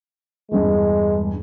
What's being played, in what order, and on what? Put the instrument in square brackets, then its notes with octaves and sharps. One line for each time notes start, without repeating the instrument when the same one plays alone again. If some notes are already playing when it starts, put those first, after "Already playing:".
[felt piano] E2 G2 [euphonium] G#3